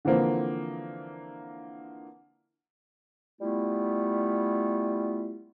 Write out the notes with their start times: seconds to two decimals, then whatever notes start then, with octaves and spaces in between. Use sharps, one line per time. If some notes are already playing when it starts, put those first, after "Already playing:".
0.05 D3 E3 F3 A#3 C4
3.40 G3 A3 B3 E4 F4